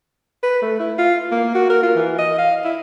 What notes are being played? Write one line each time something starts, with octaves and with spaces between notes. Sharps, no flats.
B4
A3
E4
F4
A#3
F#4
A#4
F4
E3
D#5
F5
E4